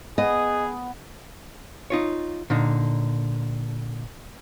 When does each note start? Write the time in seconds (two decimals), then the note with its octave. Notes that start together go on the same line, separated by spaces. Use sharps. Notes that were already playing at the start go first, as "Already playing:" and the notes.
0.18 B3 G#4 D#5
1.90 D#4 F4 C#5
2.50 A#2 D3 D#4